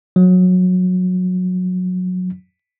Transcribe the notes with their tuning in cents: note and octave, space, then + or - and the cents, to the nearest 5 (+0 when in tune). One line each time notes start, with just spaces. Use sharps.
F#3 -20